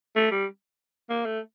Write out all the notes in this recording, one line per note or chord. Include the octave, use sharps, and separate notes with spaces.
A3
G3
A#3
A3